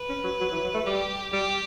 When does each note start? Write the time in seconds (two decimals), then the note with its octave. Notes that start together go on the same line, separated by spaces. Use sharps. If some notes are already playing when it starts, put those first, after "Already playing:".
Already playing: B4
0.09 C#4
0.24 F#3
0.41 F#3
0.52 E3
0.64 F#3
0.74 A3
0.86 G3 G4
1.33 G3 G4